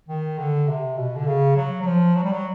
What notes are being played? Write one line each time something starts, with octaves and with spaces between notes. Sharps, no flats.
D#3
D3
C3
B2
D3
C#3
F#3
F#3
F3
F#3
G3
F#3